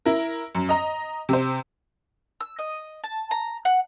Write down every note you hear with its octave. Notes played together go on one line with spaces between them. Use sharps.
E4 A#4
F#2
D#5 A#5
C3 C5
E6
D#5
A5
A#5
F#5